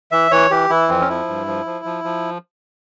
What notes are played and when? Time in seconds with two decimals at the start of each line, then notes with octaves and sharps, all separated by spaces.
0.12 E3 E5
0.31 E3 C#5
0.51 E3 G4
0.70 E3 E4
0.89 F2 C4
1.00 C#4
1.09 F3 E4
1.28 G2
1.47 F3
1.66 F3
1.85 F3
2.04 F3